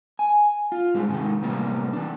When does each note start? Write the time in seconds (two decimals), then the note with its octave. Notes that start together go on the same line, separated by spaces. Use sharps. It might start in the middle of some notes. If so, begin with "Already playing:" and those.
0.19 G#5
0.72 F4
0.94 G#2 G3 G#3
1.09 G#2 C3 D#3
1.42 A2 C3 E3 G3 A#3
1.93 E3 D4